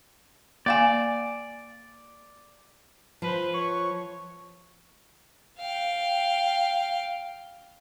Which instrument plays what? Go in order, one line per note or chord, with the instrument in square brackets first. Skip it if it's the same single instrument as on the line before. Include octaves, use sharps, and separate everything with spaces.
[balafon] A#3 F5 G#5 [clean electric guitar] D5
[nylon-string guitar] F3 [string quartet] B4 C5
[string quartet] C#5 [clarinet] C#6
[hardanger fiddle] F5 G5